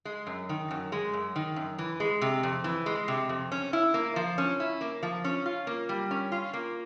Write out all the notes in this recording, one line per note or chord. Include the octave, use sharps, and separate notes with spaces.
G#3
F#2
D#3
F#2
G#3
F#2
D#3
F#2
E3
G#3
C3
F2
E3
G#3
C3
F2
C#4
E4
A#3
F3
C#4
E4
A#3
F3
C#4
F4
A#3
G3
C#4
F4
A#3